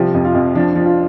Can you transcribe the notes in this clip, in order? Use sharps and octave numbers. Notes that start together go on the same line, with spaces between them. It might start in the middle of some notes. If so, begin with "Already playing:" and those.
Already playing: C2 F3 G4
F2
F4
F2
F3 D4
F3
F4